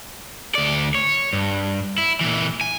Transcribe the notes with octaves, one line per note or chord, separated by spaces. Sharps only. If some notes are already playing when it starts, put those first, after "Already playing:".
D2 D5
C#5
G2
E4
A#2 E3
G#5